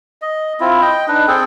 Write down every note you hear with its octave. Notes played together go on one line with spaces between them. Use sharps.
D#5
C4 E4 F4
D#5 G5
D4 D#4 B4
C4 G#4 A4 G5